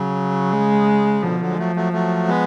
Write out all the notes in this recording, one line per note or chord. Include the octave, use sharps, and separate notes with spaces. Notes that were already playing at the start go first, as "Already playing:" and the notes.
Already playing: C#3 F#3
G#3
B2 D3 F3
D3 F#3
G#3
F#3 A3
F#3 A3
F#3 A3
G#3 B3